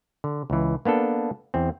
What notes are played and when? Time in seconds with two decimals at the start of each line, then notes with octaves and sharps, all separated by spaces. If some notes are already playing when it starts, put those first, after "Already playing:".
0.24 D3
0.50 C#2 E3
0.85 A#3 B3 D4 A4
1.54 E2 C4